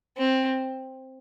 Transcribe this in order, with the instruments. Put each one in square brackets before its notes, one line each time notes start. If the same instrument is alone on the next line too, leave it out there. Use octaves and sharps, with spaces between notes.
[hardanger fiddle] C4